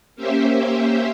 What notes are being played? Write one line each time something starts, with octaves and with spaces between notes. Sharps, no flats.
A#3 C#4 G4 C5 E5